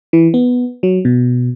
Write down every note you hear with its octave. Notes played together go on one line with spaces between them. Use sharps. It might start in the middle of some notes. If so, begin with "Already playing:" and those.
E3
B3
F#3
B2